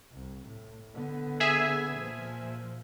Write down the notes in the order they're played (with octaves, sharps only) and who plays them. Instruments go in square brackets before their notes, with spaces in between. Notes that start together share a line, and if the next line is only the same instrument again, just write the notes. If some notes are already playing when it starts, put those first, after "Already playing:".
[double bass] C2
A2
D3 B3
[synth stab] G#4 E5 G#5
[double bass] A#2 F3